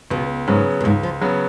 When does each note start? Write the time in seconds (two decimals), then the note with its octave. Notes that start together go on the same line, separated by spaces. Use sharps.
0.11 C#2 B2
0.47 G#2 C#3 F#3 B3
0.81 F#2
0.84 C#2 G#2
1.03 F3
1.21 C#3 F#3 B3